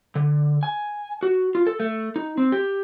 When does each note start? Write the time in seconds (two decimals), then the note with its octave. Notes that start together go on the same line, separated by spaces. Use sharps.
0.15 D3
0.63 G#5
1.23 F#4
1.55 F4
1.67 A4
1.80 A3
2.16 D#4
2.38 C4
2.52 G4